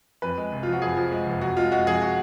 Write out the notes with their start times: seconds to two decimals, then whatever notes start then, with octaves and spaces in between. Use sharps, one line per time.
0.22 F2 B4
0.37 G#3
0.52 F1
0.63 F3 F4
0.72 F#4
0.82 F2 G#4
0.97 F3
1.12 G#3
1.27 F1
1.41 F2 F#4
1.57 G#3 F4
1.71 G#3 F#4
1.87 F2 G#4
2.02 F#4